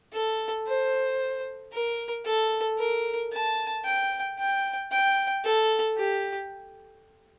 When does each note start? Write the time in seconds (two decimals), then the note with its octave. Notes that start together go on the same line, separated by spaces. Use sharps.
0.13 A4
0.67 C5
1.73 A#4
2.25 A4
2.78 A#4
3.32 A5
3.85 G5
4.39 G5
4.92 G5
5.44 A4
5.97 G4